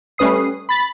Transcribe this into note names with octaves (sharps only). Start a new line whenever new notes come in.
G3 A3 C#4 B4 D#6 C7
B5 A6